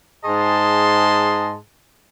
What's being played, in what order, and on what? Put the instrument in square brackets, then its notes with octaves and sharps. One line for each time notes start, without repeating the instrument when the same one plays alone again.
[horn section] G#2 G#4 D#5 A5 C6